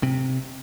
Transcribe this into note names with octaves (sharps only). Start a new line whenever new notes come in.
C3